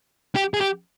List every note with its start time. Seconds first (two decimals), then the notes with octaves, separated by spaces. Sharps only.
0.35 G4
0.54 G#4
0.61 G4